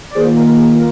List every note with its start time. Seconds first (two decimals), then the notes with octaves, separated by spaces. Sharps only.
0.11 D5
0.15 D#3 A#3 F4 G#4 C5
0.36 A#4
0.49 A#4
0.56 G#4
0.75 A#4